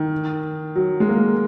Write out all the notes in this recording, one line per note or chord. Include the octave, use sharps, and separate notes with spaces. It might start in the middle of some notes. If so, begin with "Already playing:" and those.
Already playing: D#3
F#3
G#3
A#3